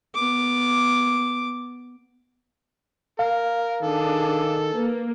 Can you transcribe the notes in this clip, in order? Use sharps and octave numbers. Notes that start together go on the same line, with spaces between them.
B3 D6
A#4 F5
D#3 D4 G#4 A4
A#3 B4